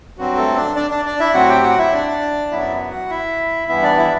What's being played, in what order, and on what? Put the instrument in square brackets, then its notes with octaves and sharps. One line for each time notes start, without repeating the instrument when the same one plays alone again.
[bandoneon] G2 F#3 C4 F#4
A3 A4
D4 D5
D4 D5
D4 D5
D4 D5
E4 E5
A2 F#3 C4 F#4 F#5
G4 G5
F#4 F#5
E4 E5
D4 D5
F#2 F#3 B3 E4 E5
F#4 F#5
E4 E5
G2 E3 B3 E4 E5
D4 D5
E4 E5